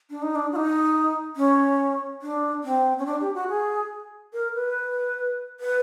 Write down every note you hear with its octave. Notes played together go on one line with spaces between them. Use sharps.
D4
D#4
D4
F#4
D#4
C#4
D4
C4
C#4
D4
G4
F#4
G#4
A#4
B4
B4